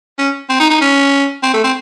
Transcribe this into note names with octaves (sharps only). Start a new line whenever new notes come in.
C#4
C4
D#4
D#4
C#4
C4
A3
C4